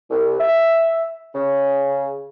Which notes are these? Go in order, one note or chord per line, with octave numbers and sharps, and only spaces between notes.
C2
E5
C#3